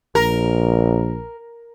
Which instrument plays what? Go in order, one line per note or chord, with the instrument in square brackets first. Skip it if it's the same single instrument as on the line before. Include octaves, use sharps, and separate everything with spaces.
[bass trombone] A#1 [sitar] A#4